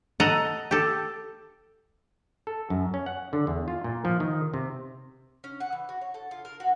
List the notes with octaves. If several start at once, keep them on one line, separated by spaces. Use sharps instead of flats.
A4 D#5 F#5 A#5
G4 A4
A4
F#2
C#4
F#5
D3
E2
F4
A#2
F3
D#3
C3
C#4
F#5
E3
F#4
C#5
A4
F4
A#4
F#4